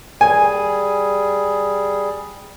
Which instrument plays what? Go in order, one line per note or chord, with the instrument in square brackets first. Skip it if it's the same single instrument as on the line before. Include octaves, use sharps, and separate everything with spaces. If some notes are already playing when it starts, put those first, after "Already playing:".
[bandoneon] G3 G#4 [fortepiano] G#5